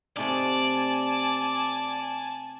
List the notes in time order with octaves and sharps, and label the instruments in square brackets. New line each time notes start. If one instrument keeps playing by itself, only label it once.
[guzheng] C3 A3 D#4 [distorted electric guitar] D5 [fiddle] G#5 A5